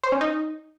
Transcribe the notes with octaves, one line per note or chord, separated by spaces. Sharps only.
C5
C#4
D#4